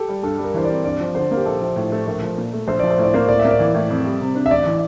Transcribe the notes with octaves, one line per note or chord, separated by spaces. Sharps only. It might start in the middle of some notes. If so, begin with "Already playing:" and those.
Already playing: G4 A4
G3
G2 A4
G3
A#4
E3 C5
D5
C4
G2 D5
F3
D3 C5
A#3
G4
A#1 A4
F3
A2
A3
A#1 A#4
F3
A#2
A3
A#1 C5
F3 D5
C5
A2 D5
A#3 C5
A2 D5
A#3 E5
D5
E3
A2
F2
G3
C3
D4
E5
A1 D5
E3